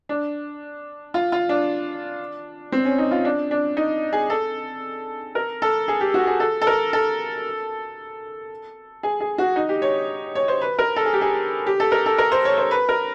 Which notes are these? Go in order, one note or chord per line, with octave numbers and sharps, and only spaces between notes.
D4
F4
F4
D4
C4
C#4
D#4
F4
D4
D4
D#4
G#4
A4
A#4
A4
G#4
G4
F#4
G#4
A4
A4
A#4
A4
G#4
G#4
F#4
D#4
G4
C#5
C#5
C5
B4
A#4
A4
G#4
G4
G#4
G4
A4
A#4
A4
A#4
C5
C#5
C5
B4
A#4